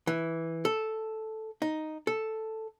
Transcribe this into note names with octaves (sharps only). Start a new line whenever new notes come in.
E3
A4
D#4
A4